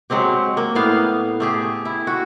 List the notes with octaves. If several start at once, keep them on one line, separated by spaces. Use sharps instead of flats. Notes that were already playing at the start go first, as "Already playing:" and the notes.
F#3 G#3 C4 G4
A#3
A2 B3 F5
A3 G4 G#4
E4
F#4